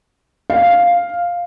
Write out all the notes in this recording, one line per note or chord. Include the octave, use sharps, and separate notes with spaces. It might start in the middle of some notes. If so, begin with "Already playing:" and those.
F5